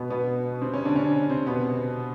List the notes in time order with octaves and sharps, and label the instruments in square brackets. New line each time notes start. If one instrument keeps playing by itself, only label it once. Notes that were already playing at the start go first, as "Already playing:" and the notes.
Already playing: [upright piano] B2 B3
B2 B3
C3 C4
C#3 C#4
D3 D4
C#3 C#4
C3 C4
B2 B3